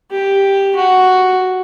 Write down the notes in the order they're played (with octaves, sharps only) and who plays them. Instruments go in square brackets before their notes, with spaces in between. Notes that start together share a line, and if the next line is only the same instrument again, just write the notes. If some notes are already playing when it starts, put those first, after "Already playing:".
[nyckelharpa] G4
F#4